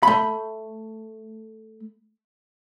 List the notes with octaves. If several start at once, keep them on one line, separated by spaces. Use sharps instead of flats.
A3 B5